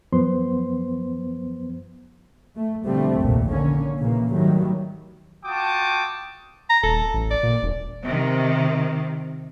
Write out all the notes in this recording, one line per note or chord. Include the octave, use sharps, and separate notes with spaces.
F#2 F3 B3 C5 C6
A3
B2 D3 F3 G3 A3 C4
F1 A#1 D#2 A#2
D3 A#3 C#4
A#2 C#3 E3 A#3
G#2 D#3 F#3 G3 A3
F4 F#4 G5 A5 D6 D#6
A#5
D#1 A4
A1
D5
A#2
E1
C3 D#3